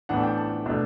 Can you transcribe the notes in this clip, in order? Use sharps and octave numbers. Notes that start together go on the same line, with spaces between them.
A2 E3 B3 D4 F#5
A5
G5
A5
B2 A3 D4